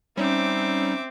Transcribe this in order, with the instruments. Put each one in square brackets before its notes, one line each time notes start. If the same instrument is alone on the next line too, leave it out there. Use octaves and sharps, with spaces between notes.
[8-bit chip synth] G3 D#4 [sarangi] C4 [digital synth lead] C#4 [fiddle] E5 D6